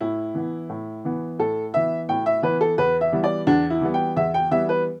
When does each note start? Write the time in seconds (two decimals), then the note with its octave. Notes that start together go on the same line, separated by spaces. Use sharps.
0.01 A2 E4
0.35 E3 B3
0.69 A2
1.05 E3 B3
1.39 A2 A4
1.74 E3 B3 E5
2.09 A2 G5
2.26 E5
2.43 E3 B3 B4
2.61 A4
2.78 E2 B4
3.01 E5
3.12 E3 G3 B3
3.24 D5
3.47 E2 D4
3.70 E4
3.81 E3 G3 B3
3.94 G5
4.16 E2 E5
4.34 G5
4.51 E3 G3 B3 E5
4.69 B4